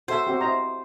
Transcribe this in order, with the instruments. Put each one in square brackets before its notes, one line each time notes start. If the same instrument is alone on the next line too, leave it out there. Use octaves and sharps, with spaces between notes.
[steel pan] F#4 A4 E5 [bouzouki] C5
[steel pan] C4 F#4 G4
E4 D#5 A#5